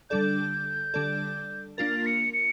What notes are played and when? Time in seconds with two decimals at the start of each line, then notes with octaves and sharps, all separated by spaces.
0.10 D3 G3 D4 A4 D5 G6
0.94 D3 G3 D4 A4 D5
1.78 A#3 D4 F4 A#4 A6
2.06 C#7
2.33 C#7